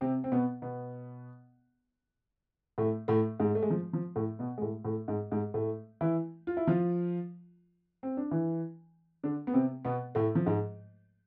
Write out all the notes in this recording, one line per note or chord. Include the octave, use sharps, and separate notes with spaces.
C3 C4
C4
B2 B3
B2 B3
A2 A3
A2 A3
G#2 G#3
A3
G#3
F3
F3
A2 A3
B2 B3
G#3
A2 A3
A2 A3
G#2 G#3
G#2 G#3
A2 A3
E3 E4
F4
E4
F3 F4
C4
D4
E3 E4
D3 D4
B3
C3 C4
B2 B3
A2 A3
F3
G#2 G#3